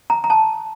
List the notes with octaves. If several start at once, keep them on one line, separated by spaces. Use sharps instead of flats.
A#5
A#5
A5